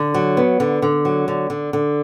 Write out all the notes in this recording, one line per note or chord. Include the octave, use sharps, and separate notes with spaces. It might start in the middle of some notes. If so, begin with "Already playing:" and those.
Already playing: D3
F#3
B3
D3
D3
F#3
D3
D3
D3